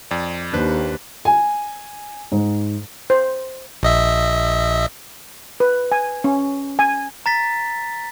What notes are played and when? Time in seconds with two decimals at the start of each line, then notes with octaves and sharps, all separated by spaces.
0.11 F2 D5
0.53 D#2 D4 B4 C5
1.25 G#5
2.32 G#2
3.10 C5
3.83 A#1 D#5 E5
5.60 B4
5.92 G#5
6.24 C#4
6.79 G#5
7.26 A#5 A6 B6